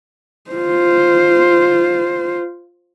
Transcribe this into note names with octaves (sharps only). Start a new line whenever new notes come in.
F4 C5